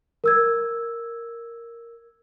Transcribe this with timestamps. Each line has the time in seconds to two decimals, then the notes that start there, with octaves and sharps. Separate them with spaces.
0.24 A#4 E6 G#6